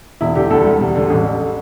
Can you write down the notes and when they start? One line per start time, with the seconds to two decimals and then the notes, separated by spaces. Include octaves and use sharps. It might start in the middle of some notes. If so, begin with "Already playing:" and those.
0.21 E1 E4
0.35 D3 G4
0.50 D2 A4
0.65 G3
0.80 E1
0.95 D3
1.10 A1
1.25 D3